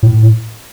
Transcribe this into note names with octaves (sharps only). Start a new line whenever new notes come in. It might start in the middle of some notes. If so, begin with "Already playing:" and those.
A2